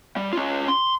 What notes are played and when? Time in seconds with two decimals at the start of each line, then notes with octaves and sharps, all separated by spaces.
0.16 G3
0.33 C#4 F4
0.68 C6